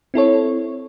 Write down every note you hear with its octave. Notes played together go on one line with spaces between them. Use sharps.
C4 E4 A4 C#5